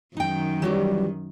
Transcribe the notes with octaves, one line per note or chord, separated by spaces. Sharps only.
F#2 D#3 D#4 G5
E3 F#3 G3 F#4 G4